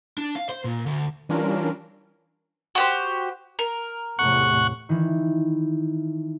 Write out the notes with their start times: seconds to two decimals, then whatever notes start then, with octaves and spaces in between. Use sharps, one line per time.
0.18 D4
0.36 F5
0.49 C5
0.64 A#2
0.86 D2
1.29 E3 G3 C#4 D4 F4 A#4
2.75 F#4 G4 C5
3.59 A#4
4.19 E2 A2 C3 F#5 C#6
4.89 D#3 E3